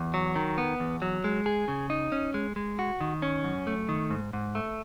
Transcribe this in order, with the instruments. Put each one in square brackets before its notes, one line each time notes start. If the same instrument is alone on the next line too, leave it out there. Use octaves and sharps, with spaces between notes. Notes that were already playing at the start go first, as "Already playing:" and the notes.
Already playing: [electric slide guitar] E2
F#3
D#3
B3
E2
F#3
G#3
G#4
C#3
D#4
C#4
G#3
G#3
F#4
D#3
C#4
F#2
A3
D#3
G#2
G#2
A3